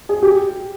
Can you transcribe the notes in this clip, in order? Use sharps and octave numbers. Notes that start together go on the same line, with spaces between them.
G#4
G4